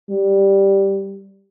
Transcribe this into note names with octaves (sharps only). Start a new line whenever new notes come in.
G3